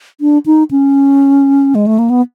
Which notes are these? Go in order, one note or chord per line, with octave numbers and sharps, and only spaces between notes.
D4
D#4
C#4
G#3
A3
A#3
B3